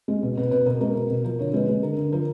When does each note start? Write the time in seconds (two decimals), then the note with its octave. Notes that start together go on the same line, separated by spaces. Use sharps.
0.08 G#3
0.23 B2
0.37 B2 B4
0.51 B2 B4
0.66 B2 A#4
0.81 G#3 A#4
0.95 B2
1.10 B2
1.24 F3 A#4
1.39 D3 C#5
1.53 G#3 B4
1.69 G#3
1.83 D3 A#4
1.97 D3
2.12 F3 A#4